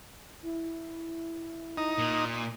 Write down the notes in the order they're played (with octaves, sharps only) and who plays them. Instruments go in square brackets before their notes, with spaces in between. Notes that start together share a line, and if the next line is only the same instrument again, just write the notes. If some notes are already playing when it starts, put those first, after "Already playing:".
[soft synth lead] E4
[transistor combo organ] D#4
[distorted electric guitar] A#2